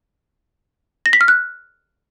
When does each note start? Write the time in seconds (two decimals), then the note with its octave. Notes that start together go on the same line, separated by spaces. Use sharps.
1.06 A#6
1.13 B6
1.21 F6
1.28 F#6